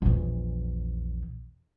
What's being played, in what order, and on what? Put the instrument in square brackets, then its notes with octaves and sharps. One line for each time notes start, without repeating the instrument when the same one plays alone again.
[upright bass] A#1 E2